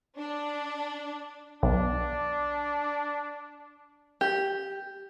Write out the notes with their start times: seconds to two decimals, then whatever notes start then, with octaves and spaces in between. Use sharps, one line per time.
0.17 D4
1.63 B1 D4
4.21 G4